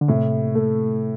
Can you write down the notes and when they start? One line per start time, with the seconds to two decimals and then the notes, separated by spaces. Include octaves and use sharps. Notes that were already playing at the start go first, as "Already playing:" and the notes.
0.01 D3
0.08 A2 C3
0.55 A3